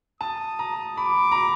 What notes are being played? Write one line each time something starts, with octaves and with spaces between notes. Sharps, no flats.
A5 D#6
A#5
B5 D6
A#5
B5